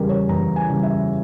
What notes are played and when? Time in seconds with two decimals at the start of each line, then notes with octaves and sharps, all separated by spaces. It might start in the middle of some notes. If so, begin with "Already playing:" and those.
Already playing: E2 C#3 G3 G4 G#4 A#4
0.09 C#5
0.29 E2 A#5
0.56 G#5
0.69 C#3 G3
0.83 E5